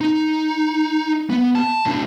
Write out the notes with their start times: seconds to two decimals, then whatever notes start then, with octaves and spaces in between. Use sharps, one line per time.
0.01 D#4
1.30 B3
1.55 A5
1.86 A2 D4